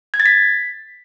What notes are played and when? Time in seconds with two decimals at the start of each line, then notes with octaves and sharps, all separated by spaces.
0.14 G#6
0.20 A6
0.26 B6